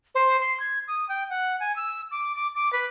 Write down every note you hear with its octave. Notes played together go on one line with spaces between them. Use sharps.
C5
C6
G#6
D#6
G5
F#5
G#5
E6
D6
D6
D6
B4